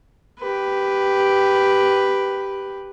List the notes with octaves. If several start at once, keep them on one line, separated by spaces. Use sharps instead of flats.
G4 B4